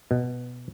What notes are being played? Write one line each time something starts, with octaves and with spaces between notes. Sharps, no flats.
B2